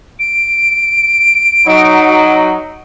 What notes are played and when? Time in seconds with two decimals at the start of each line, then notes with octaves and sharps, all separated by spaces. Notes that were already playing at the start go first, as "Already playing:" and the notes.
0.19 D7
1.67 F#3 D#4